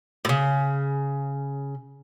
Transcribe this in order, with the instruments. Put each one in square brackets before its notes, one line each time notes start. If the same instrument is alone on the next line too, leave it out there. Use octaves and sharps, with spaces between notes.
[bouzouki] A2 C#3